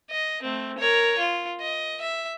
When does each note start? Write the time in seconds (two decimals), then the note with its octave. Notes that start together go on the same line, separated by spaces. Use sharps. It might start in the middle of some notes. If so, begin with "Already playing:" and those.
0.11 D#5
0.42 A3 C4
0.78 A#4 C#5
1.18 F4
1.61 D#5
2.01 E5